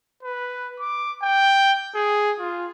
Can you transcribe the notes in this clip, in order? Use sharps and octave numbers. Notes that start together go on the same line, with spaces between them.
B4
D6
G5
G#4
F4